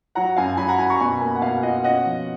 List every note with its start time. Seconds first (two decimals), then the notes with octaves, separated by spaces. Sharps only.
0.15 F#3 F#5 A#5
0.36 F#2 F5 G#5
0.57 F#3 G#5 B5
0.68 F#5 A#5
0.78 F#2 G#5 B5
0.90 A#5 C#6
0.99 B2 G#5 B5
1.20 A#3 G#5 B5
1.35 F#5
1.41 B2 F5 G#5
1.63 F4 D#5 F#5
1.83 C#4 D#5 F#5
2.06 F3